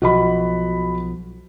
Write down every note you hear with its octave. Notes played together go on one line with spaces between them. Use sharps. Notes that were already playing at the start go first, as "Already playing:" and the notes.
B1 F3 F#4 D#5 B5